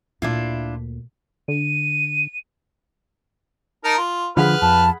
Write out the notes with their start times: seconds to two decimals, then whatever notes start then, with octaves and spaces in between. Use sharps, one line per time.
0.22 D2 A#2 D4 E4 F4
1.48 D3 D#7
3.84 D#4 A#4 A5
3.97 F4
4.37 D3 F3 G#4 B4 F#5 B5 F6
4.62 F2 A5